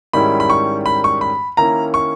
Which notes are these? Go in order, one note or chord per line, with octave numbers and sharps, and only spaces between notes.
G#2 D#3 G3 C#4 E4 B5
B5
C#6
B5
C#6
B5
D#3 A#3 C#4 E4 A#5
C#6